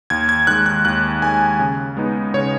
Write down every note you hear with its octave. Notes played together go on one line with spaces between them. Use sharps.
D#2 G#6
G#6
D#3 G#3 F#6
F#6
D#2 F#6
D#3 G#3 G#5
C#3
G#3 B3 D#4
C#3 C#5